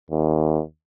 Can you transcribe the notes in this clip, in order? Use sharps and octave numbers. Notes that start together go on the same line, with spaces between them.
D#2